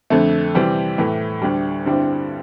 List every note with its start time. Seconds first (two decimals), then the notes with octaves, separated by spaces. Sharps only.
0.10 F2 D3 A3
0.54 C3 E3 G3 C4
0.98 A2 E3 A3
1.42 D2 D3 G3
1.86 G2 D3 G3 C4 E4